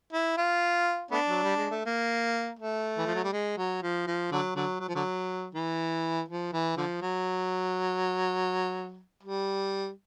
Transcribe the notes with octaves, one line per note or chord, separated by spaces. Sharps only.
E4
F4
A3 B3 D4
F#3
G3
G#3
A3
A#3
A3
E3
F3
F#3
G3
G#3
F#3
F3
F3
D3 F#3
D3 F#3
F#3
F3
D3 F#3
E3
F3
E3
D3 F3
F#3
G3